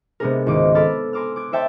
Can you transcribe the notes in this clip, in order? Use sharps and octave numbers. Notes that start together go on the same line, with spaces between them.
C3 G#3 B3 D4 G#4 A#4
G#1 C#2 D#3 C#4 D#5 D6
A4 B5 D6 E6 F6 A6
G#5 A#5 C6 D6 E6 F6
D6 F#6 G#6
C5 C#5 E5 G5 A5 C6